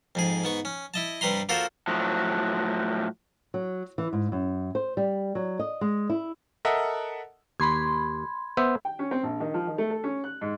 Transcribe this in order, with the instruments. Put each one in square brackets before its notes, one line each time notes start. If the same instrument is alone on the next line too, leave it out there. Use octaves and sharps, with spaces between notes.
[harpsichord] F2 G#2 G#4
G#2 B3 C#6
C#4
E4 D#5 A5
G2 C3 G3 B4 A#5 C6
A#3 F4 F#4 A4 A#4 C5
[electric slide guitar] A2 F3 F#3
[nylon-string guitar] F#3
E3
G#2
F#2
C5
G3
F#3
D#5
G#3
E4
[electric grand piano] A4 A#4 D#5 E5 F#5
[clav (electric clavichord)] D#2 [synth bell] B5 C6 G#6
[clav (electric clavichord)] B3 C5 E5
[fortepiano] G5
C#4
C4
A#1
D#3
F3
D#3
A3
A4
C#4
F#6
G#2